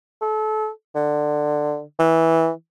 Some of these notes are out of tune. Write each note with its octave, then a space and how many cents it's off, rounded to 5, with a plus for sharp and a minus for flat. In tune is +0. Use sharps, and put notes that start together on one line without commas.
A4 -30
D3 +15
E3 -10